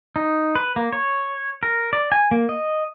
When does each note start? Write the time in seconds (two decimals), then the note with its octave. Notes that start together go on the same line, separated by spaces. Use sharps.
0.16 D#4
0.55 B4
0.76 A#3
0.92 C#5
1.63 A#4
1.93 D5
2.12 G#5
2.31 A#3
2.49 D#5